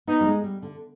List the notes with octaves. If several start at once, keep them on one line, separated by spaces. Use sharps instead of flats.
B3 D#4
G3
G#3
G3
D3